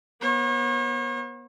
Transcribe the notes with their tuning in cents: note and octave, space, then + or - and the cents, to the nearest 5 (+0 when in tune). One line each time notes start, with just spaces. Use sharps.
B3 -30 C#5 -45